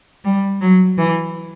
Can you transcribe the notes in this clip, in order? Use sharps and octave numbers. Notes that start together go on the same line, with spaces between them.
G3
F#3
E3